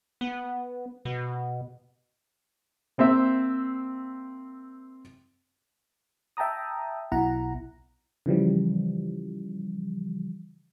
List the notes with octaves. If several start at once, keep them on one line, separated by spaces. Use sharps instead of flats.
B3
B2
A#3 C4 C5 E5
E5 G5 A5 A#5 D#6
B1 B2 E4 F#5 A#5
C#3 E3 F3 G3